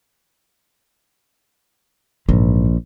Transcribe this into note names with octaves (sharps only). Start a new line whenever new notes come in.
A#1 G#2 E3